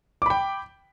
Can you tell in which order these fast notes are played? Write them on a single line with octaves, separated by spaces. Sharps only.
D6 B5 G5